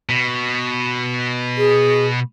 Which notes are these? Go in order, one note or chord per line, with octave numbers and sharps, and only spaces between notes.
B2
G#4